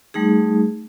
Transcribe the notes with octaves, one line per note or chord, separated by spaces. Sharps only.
G3 A3 D#4 G#4